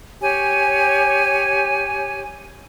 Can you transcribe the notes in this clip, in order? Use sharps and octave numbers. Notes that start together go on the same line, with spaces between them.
G4 C#5 G#5